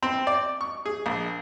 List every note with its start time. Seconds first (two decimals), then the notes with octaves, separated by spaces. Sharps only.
0.03 C4
0.27 D5
0.61 C#6
0.86 G#4
1.06 A#1